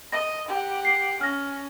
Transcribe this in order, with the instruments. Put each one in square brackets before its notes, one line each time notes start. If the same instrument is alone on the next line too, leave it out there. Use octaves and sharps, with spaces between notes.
[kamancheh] D#5 [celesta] A#6
[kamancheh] G4 F#5
[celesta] C7
[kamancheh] C#4 [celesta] F6 A#6